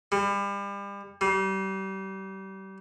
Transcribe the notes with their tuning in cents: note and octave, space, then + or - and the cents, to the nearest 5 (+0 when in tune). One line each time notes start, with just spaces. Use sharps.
G3 +35
G3 -30